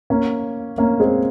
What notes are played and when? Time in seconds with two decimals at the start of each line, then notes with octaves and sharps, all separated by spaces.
0.10 A#3 C#4
0.78 A#3 C#4
1.00 G#3 C4